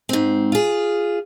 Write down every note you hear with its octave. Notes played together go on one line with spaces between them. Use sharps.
G#2 C4
F4 G#4